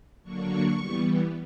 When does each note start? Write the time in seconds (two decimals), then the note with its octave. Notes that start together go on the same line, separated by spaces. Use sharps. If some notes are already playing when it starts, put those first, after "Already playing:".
0.23 D3 F#3 A#3 D4 C#6
0.77 E3 G3 B3